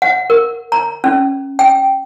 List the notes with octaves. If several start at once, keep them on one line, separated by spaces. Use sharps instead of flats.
F#5
A#4
A#5
C#4
G5